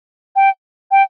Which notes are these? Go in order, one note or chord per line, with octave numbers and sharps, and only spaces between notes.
G5
G5